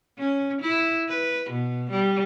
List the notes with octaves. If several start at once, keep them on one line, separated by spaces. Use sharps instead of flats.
C#4
E4
B4
B2
G3